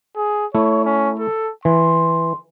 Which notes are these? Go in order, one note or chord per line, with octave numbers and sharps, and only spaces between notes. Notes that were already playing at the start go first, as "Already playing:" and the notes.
G#4
A3 E4 C#5
C#4
A4
E3 C6